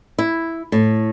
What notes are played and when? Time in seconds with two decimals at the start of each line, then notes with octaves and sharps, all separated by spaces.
0.19 E4
0.72 A2